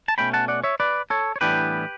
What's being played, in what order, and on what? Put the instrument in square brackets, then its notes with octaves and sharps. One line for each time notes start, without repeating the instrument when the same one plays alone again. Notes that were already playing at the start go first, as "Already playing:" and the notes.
[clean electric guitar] A5
B2 A3 C#4 G5 B5
F#5 A5
D5 F#5
C#5 E5
B4 D5
A4 C#5
C#5
A2 E3 G3 B3 D4 G4 B4